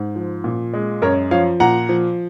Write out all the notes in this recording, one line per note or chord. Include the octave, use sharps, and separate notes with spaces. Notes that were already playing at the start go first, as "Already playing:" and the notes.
Already playing: G#2
F3
A#2
G#3
F#2 A#4 C#5
F3 C#5 F5
A#2 F#5 A#5
F3